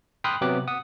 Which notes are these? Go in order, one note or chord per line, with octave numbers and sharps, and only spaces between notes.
G5 B5 C6 D#6 F6 F#6
C3 F#3 B3 G4 D6 F#6
F#5 D#6